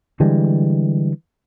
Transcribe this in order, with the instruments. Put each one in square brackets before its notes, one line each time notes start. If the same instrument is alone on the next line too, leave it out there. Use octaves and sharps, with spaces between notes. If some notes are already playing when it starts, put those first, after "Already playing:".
[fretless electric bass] D3 E3 G3 G#3